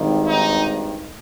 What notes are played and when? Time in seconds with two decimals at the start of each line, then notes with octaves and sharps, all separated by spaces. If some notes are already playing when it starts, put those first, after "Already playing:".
Already playing: G#1 G2 D#3
0.28 D#4